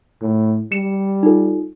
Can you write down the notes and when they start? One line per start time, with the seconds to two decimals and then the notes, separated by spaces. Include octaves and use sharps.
0.21 A2
0.72 G3 C#7 E7
1.23 D#4 F4 A4